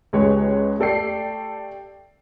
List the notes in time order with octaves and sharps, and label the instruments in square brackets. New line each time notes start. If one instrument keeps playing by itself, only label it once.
[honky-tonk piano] C#2 G#3 G4 B4 C#5
A3 G4 A4 D5 G5 C7